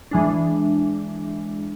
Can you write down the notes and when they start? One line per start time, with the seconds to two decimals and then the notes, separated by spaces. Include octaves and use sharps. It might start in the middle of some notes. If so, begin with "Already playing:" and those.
0.11 E3 G#3 D4